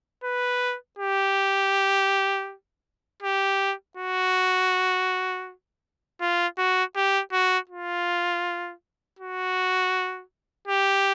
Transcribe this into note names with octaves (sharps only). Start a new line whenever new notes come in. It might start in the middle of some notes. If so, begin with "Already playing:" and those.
B4
G4
G4
F#4
F4
F#4
G4
F#4
F4
F#4
G4